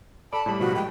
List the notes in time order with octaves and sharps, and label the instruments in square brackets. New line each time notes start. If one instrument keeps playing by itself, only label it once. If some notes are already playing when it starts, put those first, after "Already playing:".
[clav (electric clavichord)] A4 D5 [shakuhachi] A5 [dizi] B5
[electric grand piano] A2 G3 [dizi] B5
[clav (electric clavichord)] B2 D#3 F3 [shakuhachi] F#4
[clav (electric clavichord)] G#3 [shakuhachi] G5